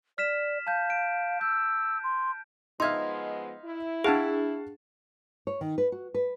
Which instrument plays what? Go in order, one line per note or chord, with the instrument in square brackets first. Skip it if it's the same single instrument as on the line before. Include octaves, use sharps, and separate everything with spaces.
[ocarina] D5 [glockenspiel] F6 B6 E7
[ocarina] F5 [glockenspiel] A5 G6
[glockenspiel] D7
[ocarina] E6 [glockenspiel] G6
[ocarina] C6
[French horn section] F3 G#3 B3 [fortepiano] D#4 E5 F5 [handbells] C6 G#6
[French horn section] E4
[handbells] D4 G#4 [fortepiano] F5 F#5 A5
[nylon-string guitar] C#5
D#3
B4
F#4
B4